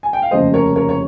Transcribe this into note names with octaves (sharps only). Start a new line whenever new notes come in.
G#5
G5
F5
F1 D#2 C#3 F3 G#3 C5 D#5
A#4 C#5
A#4 C#5
C#5